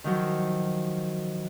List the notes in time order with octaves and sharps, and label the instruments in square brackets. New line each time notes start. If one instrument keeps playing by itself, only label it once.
[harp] D#3 F3 F#3